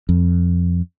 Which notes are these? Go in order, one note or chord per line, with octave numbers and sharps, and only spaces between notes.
F2